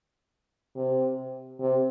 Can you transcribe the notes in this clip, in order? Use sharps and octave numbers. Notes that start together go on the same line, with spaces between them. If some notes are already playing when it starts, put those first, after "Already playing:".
C3
C3